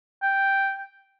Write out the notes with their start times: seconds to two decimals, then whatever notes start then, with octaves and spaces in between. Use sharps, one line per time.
0.23 G5